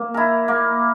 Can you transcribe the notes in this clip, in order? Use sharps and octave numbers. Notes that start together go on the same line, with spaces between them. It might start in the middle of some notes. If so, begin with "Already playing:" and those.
Already playing: A#3
E4 A#4
A#3